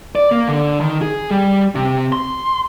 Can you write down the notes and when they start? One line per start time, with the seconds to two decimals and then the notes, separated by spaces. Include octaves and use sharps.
0.15 D5
0.32 A#3
0.48 D3
0.81 D#3
1.01 G#4
1.31 G3
1.75 C3
2.12 C6